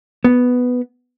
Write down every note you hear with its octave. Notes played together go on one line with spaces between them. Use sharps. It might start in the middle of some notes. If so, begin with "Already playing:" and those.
B3